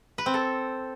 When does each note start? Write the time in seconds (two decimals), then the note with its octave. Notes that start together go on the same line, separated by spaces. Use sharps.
0.18 B4
0.26 C4
0.34 A4